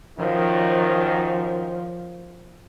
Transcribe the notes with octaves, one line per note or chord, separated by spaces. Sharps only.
F#2 D#3 F3